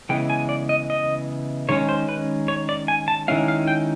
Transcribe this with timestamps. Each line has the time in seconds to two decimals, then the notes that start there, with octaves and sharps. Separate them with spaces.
0.09 C#3 E3 G#3 B3 G5
0.30 G#5
0.49 D5
0.69 D#5
0.90 D#5
1.69 D#3 G#3 C#4 C#5
1.89 C5
2.09 B4
2.48 C#5
2.69 D5
2.88 G#5
3.08 A5
3.28 D#3 G#3 C#4 E4 F5
3.48 F5
3.68 G5